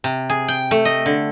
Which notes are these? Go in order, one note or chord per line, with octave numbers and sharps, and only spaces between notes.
C3
G#4
G5
A3
D#5
D3